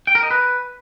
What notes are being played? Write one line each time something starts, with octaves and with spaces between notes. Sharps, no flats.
G5
A#4
D#5
B4